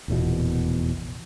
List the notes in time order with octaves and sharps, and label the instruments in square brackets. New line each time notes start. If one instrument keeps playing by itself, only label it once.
[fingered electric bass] F1 A#1 E2 B2